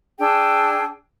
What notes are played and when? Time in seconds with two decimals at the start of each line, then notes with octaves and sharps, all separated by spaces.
0.20 D4 G#4 G5 E6